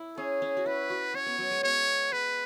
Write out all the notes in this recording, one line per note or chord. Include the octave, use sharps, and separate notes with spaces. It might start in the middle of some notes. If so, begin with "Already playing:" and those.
Already playing: E4
C#4 G#4
C#4
F#4
E4 B4
F#4
C#4 C#5
B3
F#3
G#3
B3 C#5
G#3 B4